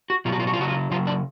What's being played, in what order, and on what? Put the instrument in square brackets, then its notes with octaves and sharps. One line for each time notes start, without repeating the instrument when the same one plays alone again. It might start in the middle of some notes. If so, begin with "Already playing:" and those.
[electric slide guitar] F#4
B2 F#3 F4
F#4
F4
F#4
F4
C#3 F#3 F#4
F4
C#3 F#3 F4
D4